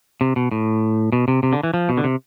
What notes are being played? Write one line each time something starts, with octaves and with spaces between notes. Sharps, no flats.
C3
B2
A2
B2
C3
C3
D3
E3
F3
B2
D3
C3